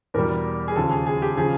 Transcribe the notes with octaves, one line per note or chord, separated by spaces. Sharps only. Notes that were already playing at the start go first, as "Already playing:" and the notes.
E2 B2 G3 A#4
G#4
D#2 C#3 F3 A4
G#4
G#4
G4
C#3 F3 G#4